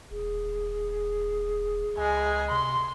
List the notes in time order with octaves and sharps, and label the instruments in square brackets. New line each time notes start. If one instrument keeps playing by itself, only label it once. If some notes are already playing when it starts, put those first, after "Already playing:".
[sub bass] D#1 [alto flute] G#4
[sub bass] C#2 [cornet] G#3 [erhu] G#5
[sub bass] C3 [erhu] C6